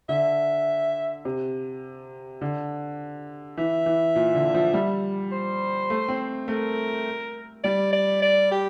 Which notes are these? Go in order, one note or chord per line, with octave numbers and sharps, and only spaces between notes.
D3 E5
C3
D3
E3 E5
E3
A#2
D3
F3
G3
C5
A3
C4
A3 A#4
G3 D5
D5
D5
G4